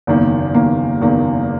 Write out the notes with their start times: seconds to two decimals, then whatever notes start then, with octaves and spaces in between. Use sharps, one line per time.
0.07 F#1 E2 D#3 A#3
0.54 F#1 E2 D#3 A#3
1.01 F#1 E2 D#3 A#3